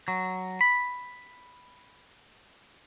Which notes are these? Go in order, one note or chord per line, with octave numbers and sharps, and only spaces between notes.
F#3
B5